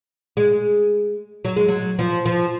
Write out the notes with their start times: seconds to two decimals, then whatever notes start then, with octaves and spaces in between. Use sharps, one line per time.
0.37 G#3
1.45 F#3
1.56 G#3
1.68 F#3
1.99 F3
2.26 F3